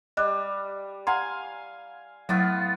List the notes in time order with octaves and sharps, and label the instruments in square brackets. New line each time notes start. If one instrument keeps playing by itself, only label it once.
[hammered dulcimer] G3 [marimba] D#5 F#6
[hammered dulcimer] F5 G#5 [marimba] F#5 A#5 C6
[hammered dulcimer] A2 B3 F4 [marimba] F#3